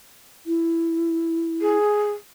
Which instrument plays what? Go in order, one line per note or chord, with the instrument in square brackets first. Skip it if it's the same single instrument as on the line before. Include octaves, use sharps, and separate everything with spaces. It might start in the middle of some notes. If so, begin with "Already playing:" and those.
[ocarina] E4
[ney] G#4